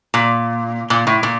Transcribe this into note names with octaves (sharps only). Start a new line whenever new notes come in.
A#2
A#2
A2
A#2